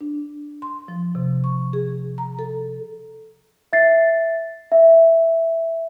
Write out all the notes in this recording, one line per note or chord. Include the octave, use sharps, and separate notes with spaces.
D4
C6
F3
C3
C#6
G#4
A#5
A4
E5 A6 C7
E5